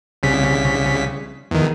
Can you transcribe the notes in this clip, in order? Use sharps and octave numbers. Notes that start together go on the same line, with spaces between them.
C2 C#3 B6
E2 D#3